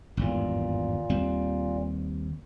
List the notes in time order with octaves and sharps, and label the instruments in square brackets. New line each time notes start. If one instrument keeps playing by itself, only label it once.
[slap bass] G#1 E2 G2 [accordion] A#2
[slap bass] D#2 G3 C4